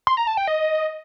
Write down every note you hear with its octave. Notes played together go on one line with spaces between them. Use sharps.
C6
A#5
A5
G5
D#5